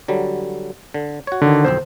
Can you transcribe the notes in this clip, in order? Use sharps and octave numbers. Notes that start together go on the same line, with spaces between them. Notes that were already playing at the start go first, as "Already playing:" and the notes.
D3 F#3 G3
D3
F#4 C#5
D3 D#3
B1 F2 C4 C5